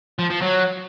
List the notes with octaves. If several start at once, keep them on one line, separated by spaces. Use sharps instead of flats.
F3
F3
F#3